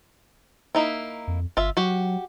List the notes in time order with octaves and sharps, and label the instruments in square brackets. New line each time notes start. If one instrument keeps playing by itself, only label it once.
[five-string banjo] A#3 D#4 E4
[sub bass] F2
[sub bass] G1 [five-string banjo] F4 E5
[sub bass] F#3 [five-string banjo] F#4 G4